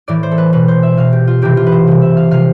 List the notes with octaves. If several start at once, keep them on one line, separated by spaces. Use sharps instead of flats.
A2 E3 D5
C5
A4
B4
B2 B4
C5
E5
B2 F5
G4
F4
C3 E3 G4
F4
B4
C5
C3 E3
E5
F5
C3 F3 F5